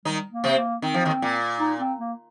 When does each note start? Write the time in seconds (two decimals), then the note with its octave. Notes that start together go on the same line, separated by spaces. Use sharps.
0.05 D#3 G3 D#4
0.31 A#3
0.44 C3 C4
0.57 A#3
0.82 D#3 C4
0.94 F3
1.05 D#2 D#3
1.22 A#2
1.60 D#4
1.80 C4
1.99 A#3